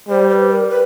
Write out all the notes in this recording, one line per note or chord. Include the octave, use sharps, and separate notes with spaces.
G3 C5
C5
B4
B4
A#4
B4